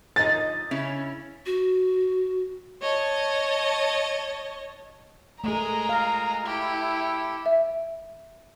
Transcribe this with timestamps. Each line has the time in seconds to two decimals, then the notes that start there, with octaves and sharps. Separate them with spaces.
0.16 F3 D#4 D#5 A6
0.71 C#3 C#4 E4
1.46 F#4
2.80 C#5 D#5 A5
5.44 G#3 A3 G#4 A#4 A#5
5.89 F5
6.45 E4 G4 A4
7.46 E5